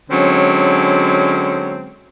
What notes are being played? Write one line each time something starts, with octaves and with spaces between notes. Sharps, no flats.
D3 F#3 G#3 C4 C#4